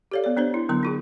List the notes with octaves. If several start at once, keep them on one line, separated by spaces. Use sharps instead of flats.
G4 A4 C#5 D5 F5
B3 D5
B3 D4 C5 C#5
E4
D3 F#3 B3 C6
D#4 F4 G#4